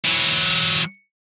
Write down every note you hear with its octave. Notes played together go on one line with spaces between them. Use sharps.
E3 F#3